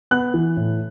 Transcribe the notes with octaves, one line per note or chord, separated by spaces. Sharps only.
B3 F#6
E3
A2